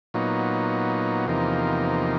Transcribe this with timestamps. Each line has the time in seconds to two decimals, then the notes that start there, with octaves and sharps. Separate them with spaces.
0.14 A#2 F#3 B3 D#4
1.26 E2 C3 F3 A#3 D#4